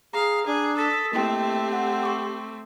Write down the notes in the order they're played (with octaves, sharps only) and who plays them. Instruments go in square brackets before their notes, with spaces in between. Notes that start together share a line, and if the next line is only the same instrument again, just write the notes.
[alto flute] G#4 [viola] F5 [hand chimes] A#5
[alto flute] D4 [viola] G#4
[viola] A4 [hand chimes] D#6 A6 B6
[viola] A3 C4 [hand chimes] A#3 E4 G5 [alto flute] G4
[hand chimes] F#5
C#6 D6